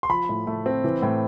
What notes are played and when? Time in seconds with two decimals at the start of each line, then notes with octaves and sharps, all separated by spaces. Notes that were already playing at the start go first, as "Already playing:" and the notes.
0.03 C6
0.09 F3 B5
0.29 A2
0.47 A3
0.66 C4
0.84 E3
1.02 A2